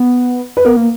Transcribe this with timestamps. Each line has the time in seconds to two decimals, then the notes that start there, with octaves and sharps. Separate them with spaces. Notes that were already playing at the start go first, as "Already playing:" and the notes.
Already playing: B3
0.57 B4
0.65 B3 A#4
0.77 A#3